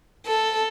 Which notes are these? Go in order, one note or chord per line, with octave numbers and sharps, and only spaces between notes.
A4